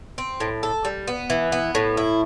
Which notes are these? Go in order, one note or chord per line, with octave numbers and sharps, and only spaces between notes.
C4
A2
A4
G3
B3
E3
B3
A2
E4